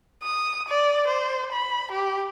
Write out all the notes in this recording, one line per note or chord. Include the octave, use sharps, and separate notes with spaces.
D#6
D5
C5
B5
G4